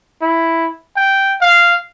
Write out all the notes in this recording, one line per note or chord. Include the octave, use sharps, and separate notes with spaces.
E4
G5
F5